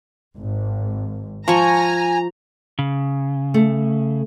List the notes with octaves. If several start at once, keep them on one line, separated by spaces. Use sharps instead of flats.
G#1
F3 G#5 A#5 C#6
C#3
A3